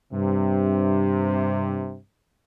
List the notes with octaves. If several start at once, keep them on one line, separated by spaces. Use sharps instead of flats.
G2 C3